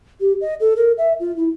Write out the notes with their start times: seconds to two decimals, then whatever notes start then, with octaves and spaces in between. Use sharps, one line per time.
0.20 G4
0.41 D#5
0.60 A4
0.76 A#4
0.97 E5
1.19 F4
1.36 E4